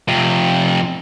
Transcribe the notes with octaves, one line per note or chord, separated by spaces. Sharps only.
F2 C3